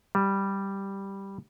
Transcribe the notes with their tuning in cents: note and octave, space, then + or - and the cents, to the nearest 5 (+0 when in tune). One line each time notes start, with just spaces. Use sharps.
G3 +0